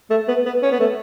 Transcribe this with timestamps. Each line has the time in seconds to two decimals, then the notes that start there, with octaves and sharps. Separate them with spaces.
0.10 A3
0.28 B3
0.46 B3
0.63 C#4
0.72 B3
0.80 A3